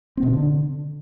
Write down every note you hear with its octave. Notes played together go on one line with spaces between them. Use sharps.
C4
B2
D4
D3